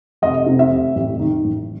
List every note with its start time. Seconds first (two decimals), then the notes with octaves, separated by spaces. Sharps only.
0.22 F1 D#5
0.46 C3
0.59 E5
0.71 F1
0.95 A1
1.20 D#3
1.44 A1